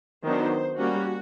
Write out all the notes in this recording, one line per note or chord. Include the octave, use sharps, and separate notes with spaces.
D#3 F#3 B3 D4 C5
G3 A#3 C#4 F#4